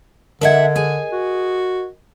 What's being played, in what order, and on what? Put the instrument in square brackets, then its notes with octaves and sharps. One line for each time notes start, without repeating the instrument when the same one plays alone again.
[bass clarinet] D3 [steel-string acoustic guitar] D4 E5 F#5 [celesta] A#4 D#5 G#6
[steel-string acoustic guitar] G#4 G#5
[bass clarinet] F#4